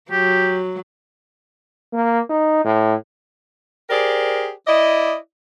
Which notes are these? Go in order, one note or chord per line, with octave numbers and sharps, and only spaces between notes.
F#3 G4
A#3
D#4
A2
G4 G#4 A#4 C5 D5
E4 D5 D#5